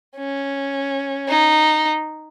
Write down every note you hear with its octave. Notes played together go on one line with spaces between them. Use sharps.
C#4
D#4